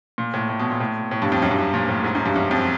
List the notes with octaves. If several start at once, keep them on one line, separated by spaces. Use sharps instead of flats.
A#2
A2
A2
B2
A#2
A2
A2
G2
F2
F#2
G2
F#2
A#2
A2
G#2
F#2
G2
F#2
F2